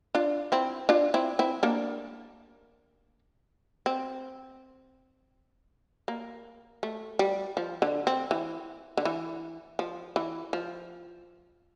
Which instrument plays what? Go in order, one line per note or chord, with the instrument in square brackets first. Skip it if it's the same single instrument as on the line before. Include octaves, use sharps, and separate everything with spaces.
[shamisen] D4 F4
C4 E4
D4 F4
C4 E4
C4 E4
A#3 D4
C4
A#3
A3
G3
F3
D3
C4
E3
D3
E3
F3
E3
F3